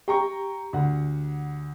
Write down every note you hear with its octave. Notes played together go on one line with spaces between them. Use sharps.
G4 G5 A#5 C#6
D2 F#5